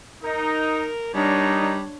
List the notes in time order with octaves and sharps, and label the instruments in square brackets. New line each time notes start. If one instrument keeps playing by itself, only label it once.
[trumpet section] D#4 [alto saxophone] A#4
[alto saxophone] G3 [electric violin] D4 C#5 [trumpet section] D#4 A#4